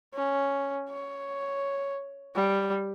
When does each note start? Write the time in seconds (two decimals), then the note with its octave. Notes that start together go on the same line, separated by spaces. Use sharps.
0.14 C#4
0.90 C#5
2.35 G3